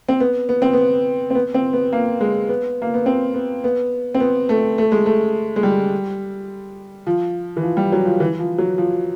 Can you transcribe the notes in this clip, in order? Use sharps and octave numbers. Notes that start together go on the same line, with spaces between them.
C4
B3
B3
C4
B3
C4
B3
C4
B3
A#3
G#3
B3
A#3
B3
C4
B3
B3
C4
B3
A3
A3
G#3
A3
G#3
G3
F3
E3
F3
G3
F#3
F3
E3
F3
F#3
F3